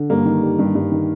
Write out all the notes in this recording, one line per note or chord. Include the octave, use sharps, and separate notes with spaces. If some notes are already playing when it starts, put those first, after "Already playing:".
Already playing: D3
G2 A#3
D#3
G3
G2
G2
D#3